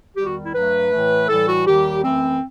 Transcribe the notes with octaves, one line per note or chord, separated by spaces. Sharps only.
E2 D#3 G3 G4
F#4
E4
G2 F#3 A3 B4
A2 E3 A3
A2 E3 G3 A4
F#4
D#2 D#3 G3 G4
F#2 E3 A3 C4